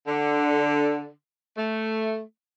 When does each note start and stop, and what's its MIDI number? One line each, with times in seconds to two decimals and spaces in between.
0.07 1.10 50
1.58 2.20 57